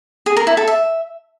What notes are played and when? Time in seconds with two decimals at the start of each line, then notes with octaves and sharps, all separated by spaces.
0.26 G#4
0.37 A#4
0.47 E4
0.57 A4
0.67 E5